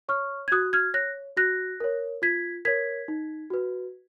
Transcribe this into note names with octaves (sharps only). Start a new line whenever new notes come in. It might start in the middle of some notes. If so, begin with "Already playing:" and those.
C#5 C#6 F6
G#6
F#4 D#6 F#6
F6 G#6
C#5 F#6 A#6
F#4 F#6 A#6
A#4 C#5
F4 G#6 B6
A#4 C#5 G#6 B6
D#4
F#4 B4